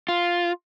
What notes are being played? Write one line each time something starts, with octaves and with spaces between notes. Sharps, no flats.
F4